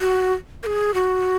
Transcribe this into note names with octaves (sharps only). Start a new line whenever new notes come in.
F#4
A#4
G#4
F#4